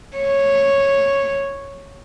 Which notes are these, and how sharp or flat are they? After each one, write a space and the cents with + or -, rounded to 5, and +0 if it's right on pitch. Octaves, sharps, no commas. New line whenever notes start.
C#5 -5